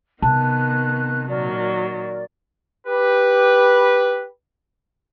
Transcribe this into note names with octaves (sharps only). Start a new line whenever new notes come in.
C3 D#3 B3 A5 F#6
A#2 D#3 F#3 A#4 D5
G4 B4